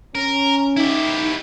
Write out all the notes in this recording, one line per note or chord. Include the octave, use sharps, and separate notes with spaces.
C#4 A#4
D#4 E4 G4